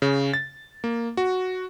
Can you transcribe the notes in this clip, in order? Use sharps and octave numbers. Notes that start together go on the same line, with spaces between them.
C#3
A6
A#3
F#4